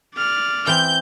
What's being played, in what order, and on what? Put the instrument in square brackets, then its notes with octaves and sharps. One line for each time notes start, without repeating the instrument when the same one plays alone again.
[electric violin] D5 F6
[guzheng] E3 C4 [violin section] G6